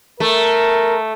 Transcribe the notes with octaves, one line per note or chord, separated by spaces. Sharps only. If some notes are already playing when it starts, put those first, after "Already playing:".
A3 A#4